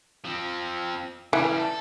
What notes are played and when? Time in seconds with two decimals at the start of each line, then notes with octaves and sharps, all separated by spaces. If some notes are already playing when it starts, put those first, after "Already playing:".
0.25 F3 C4
1.33 C#3 E3 G3
1.58 A4